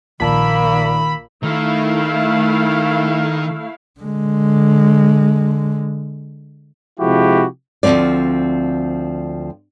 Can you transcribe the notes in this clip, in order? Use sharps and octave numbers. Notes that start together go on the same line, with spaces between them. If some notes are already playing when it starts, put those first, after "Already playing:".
A#1 D#3 A#3 A5 B5 E6
D#3 A3 E4 F5
D3 G#3
C3 F3 G#3 E4 F#4 G4
D2 A#2 F3 C4 D5